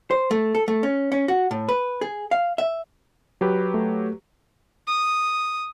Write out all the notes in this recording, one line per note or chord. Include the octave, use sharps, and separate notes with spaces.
C5
A3
A4
A3
C#4
C#4
F#4
A2
B4
G#4
F5
E5
F#3 G4 B4
A3
D#6